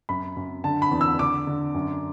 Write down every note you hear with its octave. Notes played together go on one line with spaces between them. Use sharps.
F#2 B5
F#2
D3 A5
B5
E2
E6
D3 D6
D3
F#2